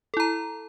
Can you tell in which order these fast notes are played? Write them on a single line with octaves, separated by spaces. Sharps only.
A4 E4 A#5